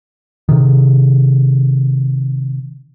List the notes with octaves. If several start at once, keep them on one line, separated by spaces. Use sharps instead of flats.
C3 D#3